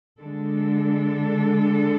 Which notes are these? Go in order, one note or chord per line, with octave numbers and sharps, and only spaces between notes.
D3 G#3 D4 A4